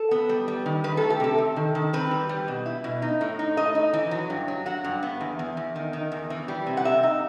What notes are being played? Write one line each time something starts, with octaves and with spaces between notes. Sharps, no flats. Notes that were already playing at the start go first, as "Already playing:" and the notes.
Already playing: A4
B3
G3
G3
D#3
D#3 B4
A3 A4
G4
C3 A4
C3
D#3
D#3
C4 B4
G3
G3
B2
E4
B2
D#4
A2
D#4
A2 D#5
D#4
E3
F#3
G2
F#3
F#3 F#5
G2
B3
E2
E2
E2
D#3
D#3
E2
E3
G3
C3
F#5
C3 E5
D#4